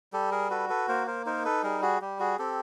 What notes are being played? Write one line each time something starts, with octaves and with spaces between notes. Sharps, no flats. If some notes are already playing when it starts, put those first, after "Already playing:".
G3 G4 A4
G#4 A#4
F#4 A4 B4
A4 B4
A#3 A#4 C5
A#4 C5
D#4 A#4 C5
A4 B4
G3 G#4 A#4
F#4 G#4
G3 G4
F#4 G#4
C4 G4 A4